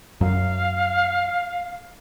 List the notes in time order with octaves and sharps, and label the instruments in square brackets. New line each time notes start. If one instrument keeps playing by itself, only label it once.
[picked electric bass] F#2 F#3 [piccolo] F5